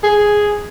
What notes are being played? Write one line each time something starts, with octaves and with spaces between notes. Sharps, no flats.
G#4